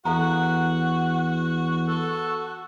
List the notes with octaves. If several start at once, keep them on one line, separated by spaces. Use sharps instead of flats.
E2 F#4 A4 F5 F#5 A#5
A4